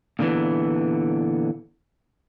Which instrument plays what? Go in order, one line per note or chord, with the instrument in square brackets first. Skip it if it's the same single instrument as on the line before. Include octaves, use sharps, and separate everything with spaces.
[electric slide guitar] A#2 D3 E3 B3